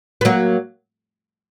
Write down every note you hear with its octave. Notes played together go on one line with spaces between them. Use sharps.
B3
F#3 A#3